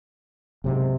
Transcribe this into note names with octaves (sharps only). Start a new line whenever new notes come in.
F#1 B1 G#2 C3